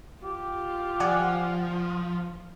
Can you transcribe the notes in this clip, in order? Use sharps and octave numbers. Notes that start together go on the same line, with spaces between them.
F4 G4
F3 D5 F#5 G#5